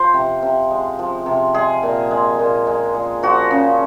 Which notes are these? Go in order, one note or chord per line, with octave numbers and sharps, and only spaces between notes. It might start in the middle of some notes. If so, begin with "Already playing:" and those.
Already playing: F3 C5
C3
C3
G#3
F3
C3
G#3 G#4
A#2
G#3
A#2
G#3
A#2
F3 F#4
C#3